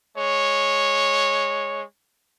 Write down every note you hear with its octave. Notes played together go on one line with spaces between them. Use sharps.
G#3 C#5